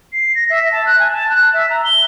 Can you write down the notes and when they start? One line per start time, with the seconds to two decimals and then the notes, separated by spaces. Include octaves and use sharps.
0.13 C7
0.35 A#6
0.50 E5
0.72 A5
0.86 F#6
0.99 G#5
1.13 A5
1.29 F#6
1.54 E5
1.70 A#5
1.85 G7